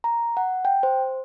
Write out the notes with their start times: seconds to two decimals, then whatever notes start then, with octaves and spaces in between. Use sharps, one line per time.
0.04 A#5
0.37 F#5
0.65 G5
0.83 C5